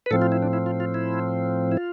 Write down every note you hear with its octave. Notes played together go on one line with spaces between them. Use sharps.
B4
A2 F3 C4 A4
F4
E4
D4
E4
F4
F4
E4
E4
F4